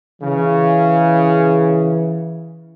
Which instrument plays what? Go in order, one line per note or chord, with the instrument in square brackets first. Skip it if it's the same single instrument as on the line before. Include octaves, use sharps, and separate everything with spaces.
[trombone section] C#3 [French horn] E3